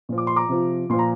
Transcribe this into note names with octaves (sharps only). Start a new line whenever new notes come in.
A#2 F3
D6
C6
A#5 D6
C3 F3
A#2 F3 C6
A#5